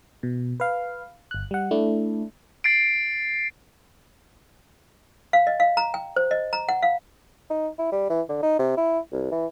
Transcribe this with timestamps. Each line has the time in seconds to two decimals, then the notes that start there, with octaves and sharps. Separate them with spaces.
0.23 B2
0.60 B4 F5
1.31 G1 F#6
1.51 G3 F#5
1.71 A3 D4 E4
2.64 A6 C7 D7
5.33 F5
5.47 D#5
5.60 F5
5.77 A#5
5.94 G5
6.16 C5
6.31 D#5
6.53 A#5
6.69 F#5
6.83 F5
7.50 D#4
7.79 E4
7.92 G3
8.09 E3
8.29 D3
8.43 D#4
8.59 C3
8.77 E4
9.12 C2
9.31 E3